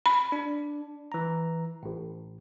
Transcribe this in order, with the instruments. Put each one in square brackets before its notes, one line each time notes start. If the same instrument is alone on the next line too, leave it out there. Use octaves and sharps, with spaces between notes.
[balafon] B5
[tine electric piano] D4
E3 A#5
A1 A2